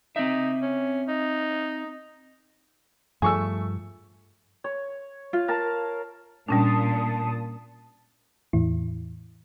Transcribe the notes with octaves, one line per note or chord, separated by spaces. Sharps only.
C4 D#4 E5
C#4
D#4
G2 F3 A3 G#4 C#6 E6
C#5
F4
A#4 F5 A5
A#2 G3 C#4 D4 A5 D#6
E2 A2 E3 E4